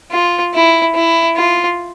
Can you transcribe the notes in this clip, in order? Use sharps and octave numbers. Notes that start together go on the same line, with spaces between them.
F4
E4
E4
F4